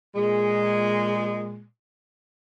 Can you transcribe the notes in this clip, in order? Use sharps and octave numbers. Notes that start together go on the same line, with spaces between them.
A#2 G#3